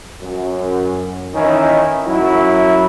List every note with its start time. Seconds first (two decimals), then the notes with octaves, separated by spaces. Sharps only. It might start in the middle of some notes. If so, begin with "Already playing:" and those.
0.21 F#2
1.34 D#3 E3 C#4 D#4 E4
2.07 F#2 F#3 E4